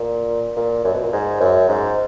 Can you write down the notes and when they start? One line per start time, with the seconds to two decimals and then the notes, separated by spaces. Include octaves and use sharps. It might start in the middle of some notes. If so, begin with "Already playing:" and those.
Already playing: A#2
0.56 A#2
0.84 F#2
0.94 B2
1.03 A#2
1.13 G#2
1.40 F#2
1.69 G#2